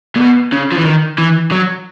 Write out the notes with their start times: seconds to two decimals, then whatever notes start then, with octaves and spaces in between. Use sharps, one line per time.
0.16 A#2
0.20 B2
0.53 C#3
0.72 F3
0.78 E3
0.85 D#3
1.18 E3
1.51 F#3